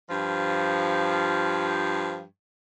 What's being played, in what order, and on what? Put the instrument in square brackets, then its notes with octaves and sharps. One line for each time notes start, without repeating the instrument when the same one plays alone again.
[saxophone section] G2 F3